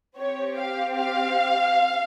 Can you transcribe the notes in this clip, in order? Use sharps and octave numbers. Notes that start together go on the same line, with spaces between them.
C4 G4 C#5
F5
F5